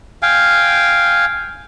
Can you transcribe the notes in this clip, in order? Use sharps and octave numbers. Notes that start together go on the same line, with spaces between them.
F5 G5 G#5